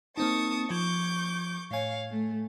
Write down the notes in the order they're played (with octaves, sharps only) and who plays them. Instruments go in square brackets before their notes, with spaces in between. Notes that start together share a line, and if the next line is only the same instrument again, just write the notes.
[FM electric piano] A#3 C4 D#4 [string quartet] A5 C#6 D#6
[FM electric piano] F3 G#6 [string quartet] C#6 D6 G6
[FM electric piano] A2 G#5 [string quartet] C#5 F5
[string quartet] A3